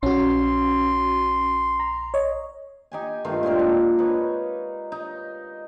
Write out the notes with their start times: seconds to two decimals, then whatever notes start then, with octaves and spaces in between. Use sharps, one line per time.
0.03 A#1 C#4 F#4 C6
1.80 A#5
2.14 C#5 D#5
2.92 D#4 G4 G#5
3.25 G2 D#3 A3 F4
3.43 A#2 G#3 C4 A#4
3.59 D4
3.99 D#4 B4 C#5
4.92 D#4